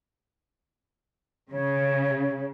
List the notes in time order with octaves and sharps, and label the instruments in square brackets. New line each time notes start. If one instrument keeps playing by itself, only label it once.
[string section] C#3 [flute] C#5